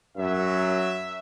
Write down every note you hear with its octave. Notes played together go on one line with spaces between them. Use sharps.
F#2 F#3 E5